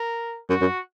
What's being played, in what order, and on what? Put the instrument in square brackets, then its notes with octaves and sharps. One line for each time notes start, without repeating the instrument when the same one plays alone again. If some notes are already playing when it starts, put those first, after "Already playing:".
Already playing: [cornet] A#4
[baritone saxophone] F#2 [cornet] F#4
[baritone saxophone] F#2